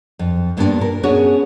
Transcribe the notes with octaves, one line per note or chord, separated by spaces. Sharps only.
F2
G2 A#2 A#3 B3 C#4 D4
A#4
B3 C#4 D4 F#4 G#4 C#5